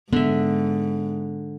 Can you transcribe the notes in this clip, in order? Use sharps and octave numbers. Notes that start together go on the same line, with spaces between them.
G#2 D3 B3 E5